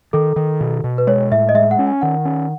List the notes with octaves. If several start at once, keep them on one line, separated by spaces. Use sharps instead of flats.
D#3 A4
D#3
B2
B2
B4
G#3 C#5
A2 E5
D#5
G#3 E5
F#5
C#4
G#5
D#3 F#5
C#4